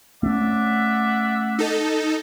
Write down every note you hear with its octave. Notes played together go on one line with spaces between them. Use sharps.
A3 C#4 D5 E5 F#5
D#4 A4